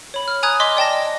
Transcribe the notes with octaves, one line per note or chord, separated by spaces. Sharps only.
C#5 B5
F6
G#5 A#5 D#6 F#6 G#6
D#5 C6 D6 B6
D5 G5 A5 A#6
D#5